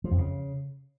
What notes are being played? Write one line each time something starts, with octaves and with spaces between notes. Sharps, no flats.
F3
F2
C#3